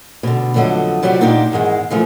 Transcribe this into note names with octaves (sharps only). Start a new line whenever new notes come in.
B2 D3
F2 D3 F#3 A3 D#5
C3 F#3 G3 F4 F#4
A#2 D4 D#4 F4 G4 D5
E2 G#2 D#3 G#3
C#3 E3 F3 A3 A#3